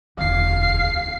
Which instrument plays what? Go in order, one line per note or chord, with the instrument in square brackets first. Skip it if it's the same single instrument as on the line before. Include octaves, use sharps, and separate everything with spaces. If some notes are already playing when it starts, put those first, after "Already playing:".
[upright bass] E1 D2 [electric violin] F5 C7